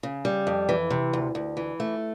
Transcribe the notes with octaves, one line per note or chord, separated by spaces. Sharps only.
C#3
G3
F2
E3
C3
D2
D2
E3
A3